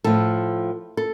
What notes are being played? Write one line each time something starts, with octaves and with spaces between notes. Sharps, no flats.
A2 F3 A4
A4